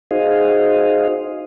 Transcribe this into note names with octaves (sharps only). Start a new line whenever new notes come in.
D#4 F#4 G#4 C5 D#5 F5